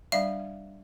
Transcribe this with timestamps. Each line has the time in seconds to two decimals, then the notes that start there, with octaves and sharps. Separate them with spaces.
0.12 G3 D4 D5 E5 F5